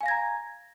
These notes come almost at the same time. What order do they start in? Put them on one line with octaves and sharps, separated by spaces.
G#5 F5 A#6 G#6 A#5